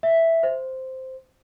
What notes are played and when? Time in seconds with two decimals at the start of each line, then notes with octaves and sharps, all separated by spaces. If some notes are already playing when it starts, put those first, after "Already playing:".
0.03 E5
0.43 C5